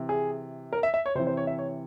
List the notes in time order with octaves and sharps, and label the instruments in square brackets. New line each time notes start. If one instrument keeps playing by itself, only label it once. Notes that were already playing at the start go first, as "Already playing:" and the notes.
Already playing: [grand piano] C3 E3
G#4
A#4
E5
E5
C#5
C3 C5
E3
C5
C#5
E5
C#5